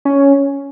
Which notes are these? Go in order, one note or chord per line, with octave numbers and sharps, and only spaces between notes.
C#4